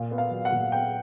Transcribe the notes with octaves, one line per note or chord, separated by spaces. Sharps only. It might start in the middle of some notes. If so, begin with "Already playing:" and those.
Already playing: A#2 F5
B3
F5
F#3
F#5
A#2
B3 G5